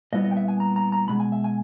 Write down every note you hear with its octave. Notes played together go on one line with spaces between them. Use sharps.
A#2 G3 B3 E4 D#5
D#5
G5
E5
G#5
A#5
A#5
A#5
E2 B2 G#3 B5
G#5
E5
G#5